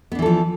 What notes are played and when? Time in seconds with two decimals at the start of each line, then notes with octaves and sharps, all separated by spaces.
0.12 B3
0.15 D4
0.19 E3
0.22 A4
0.26 F3